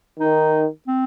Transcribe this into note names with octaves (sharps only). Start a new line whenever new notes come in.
D#3 D#4
C4